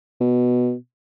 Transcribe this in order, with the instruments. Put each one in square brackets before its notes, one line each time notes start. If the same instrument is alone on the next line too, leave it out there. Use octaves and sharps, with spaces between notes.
[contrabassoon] B2